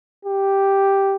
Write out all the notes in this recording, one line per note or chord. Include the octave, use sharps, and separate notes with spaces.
G4